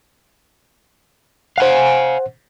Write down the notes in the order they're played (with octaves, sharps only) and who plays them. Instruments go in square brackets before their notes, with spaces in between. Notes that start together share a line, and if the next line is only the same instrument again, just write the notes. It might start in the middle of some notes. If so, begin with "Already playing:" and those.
[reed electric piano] C5 F#5 [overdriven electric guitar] F5 G#5